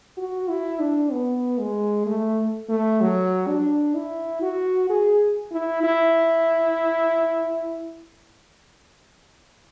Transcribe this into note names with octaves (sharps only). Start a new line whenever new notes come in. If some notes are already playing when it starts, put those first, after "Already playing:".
F#4
E4
D4
B3
G#3
A3
A3
F#3
D4
E4
F#4
G#4
E4
E4